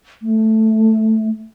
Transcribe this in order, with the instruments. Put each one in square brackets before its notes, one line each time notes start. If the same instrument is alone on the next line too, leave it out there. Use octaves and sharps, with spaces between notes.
[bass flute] A3